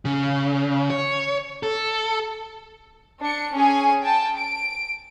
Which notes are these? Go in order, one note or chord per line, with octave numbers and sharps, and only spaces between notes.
C#3
C#5
A4
D4 C#7
C#4 G#4 G#5
G5 A5
D7